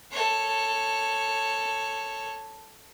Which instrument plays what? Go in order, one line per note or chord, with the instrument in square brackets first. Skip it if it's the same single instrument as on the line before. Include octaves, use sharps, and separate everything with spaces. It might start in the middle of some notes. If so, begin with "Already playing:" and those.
[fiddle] A4 C#5